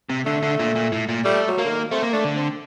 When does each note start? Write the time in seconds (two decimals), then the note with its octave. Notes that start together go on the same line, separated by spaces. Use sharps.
0.09 C3
0.25 D3 A3
0.43 D3
0.59 A#2
0.75 A#2
0.92 A2
1.09 A#2
1.25 G3 A3
1.48 F#3
1.58 A#3
1.65 D3
1.69 D#3
1.91 A3 C4
2.02 A#3
2.13 A3 D4
2.24 D3
2.36 C4